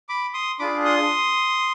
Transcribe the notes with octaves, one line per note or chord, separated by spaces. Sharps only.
B5 D6
C6 D#6
D4 F4 G#4 B5 D6
C6 D#6